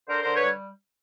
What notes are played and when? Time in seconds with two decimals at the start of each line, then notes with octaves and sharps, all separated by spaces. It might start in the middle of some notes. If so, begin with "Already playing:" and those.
0.08 D3 A#4 C5
0.22 D3 A#4 C5
0.34 B4 C#5
0.44 G3